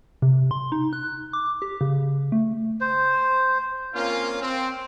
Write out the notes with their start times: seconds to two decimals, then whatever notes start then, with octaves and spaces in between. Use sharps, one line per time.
0.22 C3
0.51 C6
0.72 D#4
0.93 F#6
1.33 D6
1.62 G4
1.81 C#3
2.32 A3
2.81 C5
3.95 A#3 C4 C#4 F4
4.42 C4